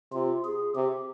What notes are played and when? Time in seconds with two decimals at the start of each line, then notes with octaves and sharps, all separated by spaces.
0.12 C3 F4
0.44 G#4
0.75 C3 G4